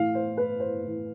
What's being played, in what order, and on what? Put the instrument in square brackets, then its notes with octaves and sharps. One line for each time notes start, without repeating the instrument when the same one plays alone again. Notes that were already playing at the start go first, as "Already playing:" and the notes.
Already playing: [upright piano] A2 E3 F5
C5
B4
C5
A2 E3